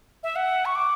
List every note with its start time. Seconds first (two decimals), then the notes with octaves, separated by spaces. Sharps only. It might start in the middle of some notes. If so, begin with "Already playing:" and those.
0.23 E5
0.36 F#5
0.65 C#6
0.75 D6